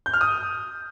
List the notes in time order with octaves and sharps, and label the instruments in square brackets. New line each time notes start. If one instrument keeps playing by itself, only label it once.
[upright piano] G6
F6
D#6